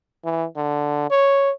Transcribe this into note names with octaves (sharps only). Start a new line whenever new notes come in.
E3
D3
C#5